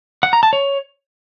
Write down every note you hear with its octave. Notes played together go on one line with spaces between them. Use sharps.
F#5
A#5
A5
C#5